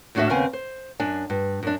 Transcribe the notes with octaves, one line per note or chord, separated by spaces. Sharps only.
D#2 A2 D4 F#4 D#5 E5
D#2 C#3 B3 C4 F5 G#5
C5
F#2 D4 G#5
G2
F#2 D4